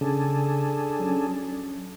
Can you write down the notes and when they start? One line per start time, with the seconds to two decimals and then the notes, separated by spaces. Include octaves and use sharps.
0.01 C#3 D4 G#4 A4
1.00 F#3 C#4